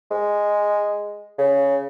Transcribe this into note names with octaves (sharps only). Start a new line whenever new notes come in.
G#3
C#3